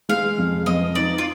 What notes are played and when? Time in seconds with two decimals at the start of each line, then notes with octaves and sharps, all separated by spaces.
0.09 G#3 F5
0.38 F2
0.66 F2 D#5
0.95 D#4 D5
1.18 F4